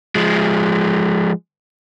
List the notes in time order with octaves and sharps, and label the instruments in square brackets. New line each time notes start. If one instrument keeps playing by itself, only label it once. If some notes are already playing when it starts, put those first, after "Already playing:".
[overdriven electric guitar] F3 G#3